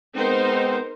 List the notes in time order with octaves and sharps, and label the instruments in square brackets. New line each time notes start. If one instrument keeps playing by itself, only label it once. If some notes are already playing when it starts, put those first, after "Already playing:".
[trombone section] G#3 B3 C4 [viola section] D#4 A#4 C5